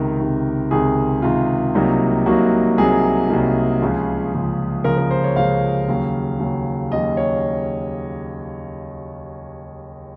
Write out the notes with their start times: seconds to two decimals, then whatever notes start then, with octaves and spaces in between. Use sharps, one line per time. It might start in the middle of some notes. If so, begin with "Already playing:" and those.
Already playing: C#2 C3 D#3 A#4
0.19 C#2 C3 D#3
0.71 C#2 C3 D#3 G#4
1.22 C#2 C3 D#3 F4
1.74 C2 C3 F#3 A#3 D#4
2.26 C2 C3 F#3 A#3 D#4 F#4
2.78 C2 C3 F#3 A#3 D#4 G#4
3.29 C2 C3 F#3 A#3 D#4
3.81 C#2 C#3 F3
4.33 C#2 C#3 F3
4.84 C#2 C#3 F3 A#4
4.98 A#4
5.11 C5
5.24 C#5
5.36 C#2 C#3 F3 F5
5.88 D#2 C#3 F#3
6.40 D#2 C#3 F#3
6.91 D#2 C#3 F#3 D#5
7.17 C#5